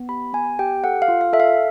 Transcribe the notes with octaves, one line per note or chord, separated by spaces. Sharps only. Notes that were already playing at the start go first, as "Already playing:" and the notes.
Already playing: B3
G4 B5
B3 G#5
G4 G5
A4 F#5
F5
F4
F5
A4 E5
F5